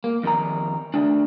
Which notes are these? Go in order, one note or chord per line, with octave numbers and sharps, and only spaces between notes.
A#3
F2 D#3 A#5
D3 A3 D4